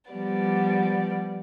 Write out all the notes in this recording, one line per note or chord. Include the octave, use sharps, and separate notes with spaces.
F3 G3 B3 D5